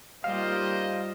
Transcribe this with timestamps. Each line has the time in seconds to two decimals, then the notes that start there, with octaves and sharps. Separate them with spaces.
0.24 G3 A#3 D#4 F4 G4 C5 D#5 F5